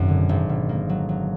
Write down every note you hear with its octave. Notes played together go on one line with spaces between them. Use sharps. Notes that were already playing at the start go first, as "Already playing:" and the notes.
Already playing: G#1 F#2 B2 C4
D3
G#1
B2
A#3
F#3
F#3